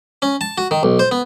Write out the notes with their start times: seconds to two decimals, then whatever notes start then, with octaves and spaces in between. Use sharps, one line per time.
0.22 C#4
0.41 A5
0.58 F#4
0.71 D#3
0.83 B1
0.99 C5
1.11 B3